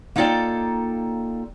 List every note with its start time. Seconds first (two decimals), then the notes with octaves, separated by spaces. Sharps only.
0.16 A#3 D#4 F4 A4 D5 G5